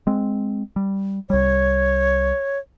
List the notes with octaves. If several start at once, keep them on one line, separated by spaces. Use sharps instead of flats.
G#3 C4
G3
C2 G3 C#5